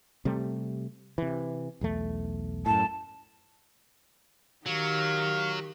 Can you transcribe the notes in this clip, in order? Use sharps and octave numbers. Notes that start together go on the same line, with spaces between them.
C3 G3 A3
C3 E3
B1 E2 A3
F#2 A2 A5
D#3 F#3 G4 F5